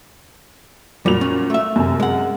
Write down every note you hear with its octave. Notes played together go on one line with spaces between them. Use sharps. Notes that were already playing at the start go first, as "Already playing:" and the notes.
A#2 F#3 G3 F7
C#4
A3 E5
F#2 C3 G#5
G#3 F#5